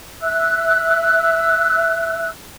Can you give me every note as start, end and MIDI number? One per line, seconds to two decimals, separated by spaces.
0.22 2.29 76
0.22 2.29 88
0.22 2.29 90